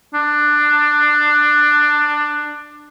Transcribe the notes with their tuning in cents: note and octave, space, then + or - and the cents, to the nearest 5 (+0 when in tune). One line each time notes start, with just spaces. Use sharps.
D4 +15